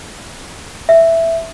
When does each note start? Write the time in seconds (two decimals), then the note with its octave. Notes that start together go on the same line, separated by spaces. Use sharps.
0.89 E5